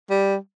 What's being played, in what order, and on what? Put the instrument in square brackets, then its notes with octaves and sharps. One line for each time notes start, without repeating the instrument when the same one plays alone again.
[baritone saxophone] G3